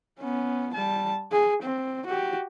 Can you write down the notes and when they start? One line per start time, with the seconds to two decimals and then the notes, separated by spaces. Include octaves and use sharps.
0.20 B3 C#4
0.74 G3 A5
1.32 G#4
1.63 C4
2.06 F#4 G4